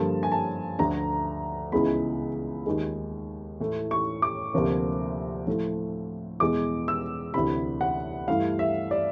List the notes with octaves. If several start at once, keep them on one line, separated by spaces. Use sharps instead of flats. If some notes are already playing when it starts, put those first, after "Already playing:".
Already playing: G2 D3 F3 A#3 A5
G#5
A5
D2 D3 F3 A3 A#5
C#2 C#3 E3 G#3 B3 B5
D#2 D#3 G#3
A2 E3 A3
C#6
D6
D2 C3 F3 A#3
A2 F3 A3
E2 B2 G#3 D6
E6
D2 C3 E3 B5
F#5
G2 E3 A3 F5
E5
D5